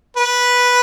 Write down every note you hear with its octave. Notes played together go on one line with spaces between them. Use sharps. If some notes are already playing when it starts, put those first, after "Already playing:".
B4